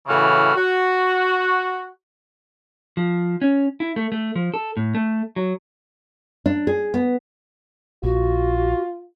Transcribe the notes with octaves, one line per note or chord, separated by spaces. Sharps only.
A2 C#3 E3 F#4 F6
F#4
F3
C#4
E4
A3
A3
F3
A4
A2
A3
F#3
D4
G#4
B3
A#1 F4 F#4